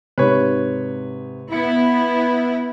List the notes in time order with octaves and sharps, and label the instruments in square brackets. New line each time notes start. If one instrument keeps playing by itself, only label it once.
[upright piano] G#2 C3 [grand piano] B4 C#5
[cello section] B3 E4 [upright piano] C#7